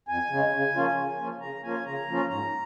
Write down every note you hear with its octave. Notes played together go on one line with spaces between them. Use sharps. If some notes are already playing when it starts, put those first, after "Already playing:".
F2 G#5
C#3 G#3
C#3
F3 A#3 C#4 F4
C#3
F3 A#3 C#4 F4
C#3 A#5
F3 A#3 C#4 F4 G#5
C#3 A#5
F3 A#3 C#4 F4
G#2 A#5